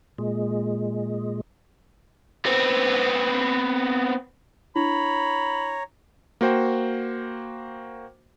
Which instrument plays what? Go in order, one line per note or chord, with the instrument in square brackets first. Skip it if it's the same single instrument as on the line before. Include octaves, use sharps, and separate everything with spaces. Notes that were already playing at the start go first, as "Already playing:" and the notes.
[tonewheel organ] A#2 G#3
[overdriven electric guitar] B3 C4
[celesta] D4 E4 [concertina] C#5 A#5 [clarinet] B5
[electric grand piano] A#3 F#4 C5 G5